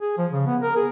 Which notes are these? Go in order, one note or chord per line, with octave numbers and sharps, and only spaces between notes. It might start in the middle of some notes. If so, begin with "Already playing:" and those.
G#4
F3
C#3
B3
A#4
G#4